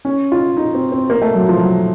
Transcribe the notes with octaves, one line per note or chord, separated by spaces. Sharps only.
C#4
F4
D#4
C4
C4
A#3
A3
F#3
F3
F#3